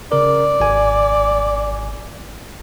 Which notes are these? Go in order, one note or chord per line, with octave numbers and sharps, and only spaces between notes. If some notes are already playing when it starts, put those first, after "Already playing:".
C#3 A#4 D5
G#1 G#5